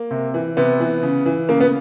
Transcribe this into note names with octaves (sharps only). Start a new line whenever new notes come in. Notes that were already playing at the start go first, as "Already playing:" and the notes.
Already playing: A#3
C3
E3
C3 B3
E3
C#3
E3
C#3 A#3
B3